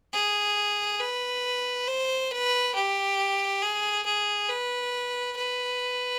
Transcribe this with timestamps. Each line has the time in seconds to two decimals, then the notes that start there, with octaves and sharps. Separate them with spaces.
0.13 G#4
1.00 B4
1.88 C5
2.31 B4
2.75 G4
3.62 G#4
4.06 G#4
4.49 B4
5.36 B4